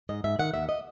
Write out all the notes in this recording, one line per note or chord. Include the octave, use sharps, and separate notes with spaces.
G#2 D#5
G#2 E5
D#3 F#5
D#2 E5
D#5